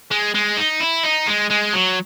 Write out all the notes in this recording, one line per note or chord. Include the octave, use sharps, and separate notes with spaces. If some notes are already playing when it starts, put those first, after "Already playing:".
G#3
G#3
D#4
E4
D#4
G#3
G#3
F#3